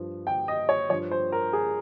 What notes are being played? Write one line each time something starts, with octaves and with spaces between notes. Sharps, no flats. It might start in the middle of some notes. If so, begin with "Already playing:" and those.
Already playing: G2 F3
G5
D#5
C#5
G2 F3 C#5
C5
A#4
G#4